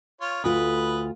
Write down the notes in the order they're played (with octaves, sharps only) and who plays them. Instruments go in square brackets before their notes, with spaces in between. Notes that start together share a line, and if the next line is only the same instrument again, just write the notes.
[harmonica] F4 C#5
[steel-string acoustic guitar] D2 F4 [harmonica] B4 D#5 B5